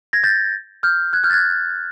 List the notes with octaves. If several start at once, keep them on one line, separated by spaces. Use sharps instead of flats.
G#6 A#6
G6 A6
F6 G6
F#6 G#6
F6 G6
A6
F#6 G#6